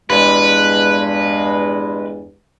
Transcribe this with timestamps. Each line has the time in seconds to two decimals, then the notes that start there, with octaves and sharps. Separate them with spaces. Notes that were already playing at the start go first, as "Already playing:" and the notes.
0.10 E2 G2 G#3 B4